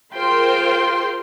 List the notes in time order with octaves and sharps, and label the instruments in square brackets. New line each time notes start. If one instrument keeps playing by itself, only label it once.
[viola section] F4 G#4 A#4 C5 G5 C6